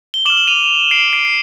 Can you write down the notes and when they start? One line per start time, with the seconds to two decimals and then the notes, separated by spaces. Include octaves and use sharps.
0.14 G7
0.25 D6 E7 F#7
0.30 F6
0.37 F#7
0.47 D#7 F7
0.91 C7 D7
1.13 C7 D7
1.25 C7